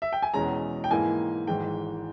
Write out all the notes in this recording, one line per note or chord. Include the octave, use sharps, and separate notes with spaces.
E5
G5
G#5
E2 B2 G#3 C#4 A#5
G5
G#2 E3 A#3 E4 G#5
G#1 G#2 E3 G#3 G5